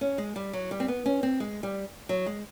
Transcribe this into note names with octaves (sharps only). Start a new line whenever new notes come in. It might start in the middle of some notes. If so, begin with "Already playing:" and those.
C#4
G#3
G3
F#3
G3
C4
B3
C#4
C4
G#3
G3
F#3
G#3